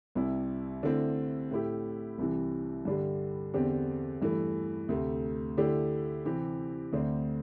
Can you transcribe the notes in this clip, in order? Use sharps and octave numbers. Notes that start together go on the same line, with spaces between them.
C2 C3 G3 E4
D3 A3 C4 E4
A2 A3 E4 G4
C2 C3 E3
G2 D3 G3
E2 D3 C4 G4
G2 E3 A3
D2 C3 A3
D3 A3 E4 G4
C3 E3 C4 G4
D2 D3 C4